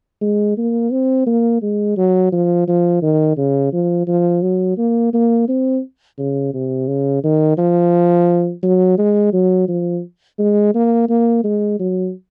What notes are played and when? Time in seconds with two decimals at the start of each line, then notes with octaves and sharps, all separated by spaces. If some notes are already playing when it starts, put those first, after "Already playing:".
0.22 G#3
0.58 A#3
0.92 C4
1.27 A#3
1.63 G#3
1.97 F#3
2.33 F3
2.68 F3
3.02 D#3
3.38 C#3
3.73 F3
4.08 F3
4.42 F#3
4.78 A#3
5.14 A#3
5.49 C4
6.18 C#3
6.54 C3
6.88 C#3
7.24 D#3
7.58 F3
8.63 F#3
8.98 G#3
9.33 F#3
9.69 F3
10.39 G#3
10.75 A#3
11.09 A#3
11.44 G#3
11.80 F#3